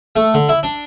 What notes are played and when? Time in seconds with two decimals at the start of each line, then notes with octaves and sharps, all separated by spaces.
0.16 A3
0.34 D3
0.49 E4
0.63 D4